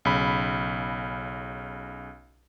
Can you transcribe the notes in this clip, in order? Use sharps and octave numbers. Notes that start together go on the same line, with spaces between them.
B1 C#3 B5